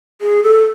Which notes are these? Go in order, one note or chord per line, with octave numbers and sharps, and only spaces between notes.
G#4
A4